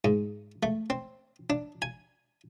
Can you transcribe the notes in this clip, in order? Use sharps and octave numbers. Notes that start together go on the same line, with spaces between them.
G#2
A3
C4
D4
G#5